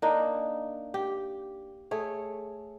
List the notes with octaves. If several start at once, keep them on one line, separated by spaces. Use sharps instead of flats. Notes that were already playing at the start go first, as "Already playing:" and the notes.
A#3 D4 D#4
G4
A3 G#4 C#5